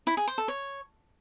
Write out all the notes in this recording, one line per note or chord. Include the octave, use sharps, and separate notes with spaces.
E4
G#4
C5
A4
C#5